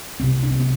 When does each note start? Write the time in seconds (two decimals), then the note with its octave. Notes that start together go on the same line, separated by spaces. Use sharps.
0.20 C2 C4
0.23 C3
0.43 D4
0.51 C4
0.59 B3